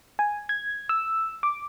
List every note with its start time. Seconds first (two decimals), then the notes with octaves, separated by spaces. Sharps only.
0.19 G#5
0.49 G#6
0.89 E6
1.43 D6